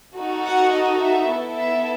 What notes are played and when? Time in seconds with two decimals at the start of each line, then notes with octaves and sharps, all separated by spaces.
0.16 D#4 F#4 A4
0.44 F#5
0.72 D#5
1.00 E5
1.28 B3 E4 A4
1.57 E5